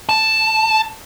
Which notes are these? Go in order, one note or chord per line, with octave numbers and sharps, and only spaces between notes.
A5